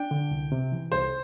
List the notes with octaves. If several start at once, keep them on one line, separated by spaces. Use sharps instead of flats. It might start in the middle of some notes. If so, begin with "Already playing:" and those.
Already playing: D4 G5
D3
C2
C3
E3
C2 C5